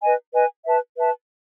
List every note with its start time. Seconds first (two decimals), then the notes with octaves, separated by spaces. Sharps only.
0.02 B4 D#5 G#5
0.33 B4 D#5 G#5
0.66 B4 E5 A5
0.96 B4 E5 A5